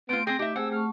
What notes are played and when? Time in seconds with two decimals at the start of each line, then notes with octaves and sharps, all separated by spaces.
0.09 A3 B3 C4 F4 D7
0.27 C4 G#4 G5 A#6
0.39 D#4 G4 E5
0.56 A3 C4 G#4 F#5 G#5 E6
0.72 A3 A5 C#6 F6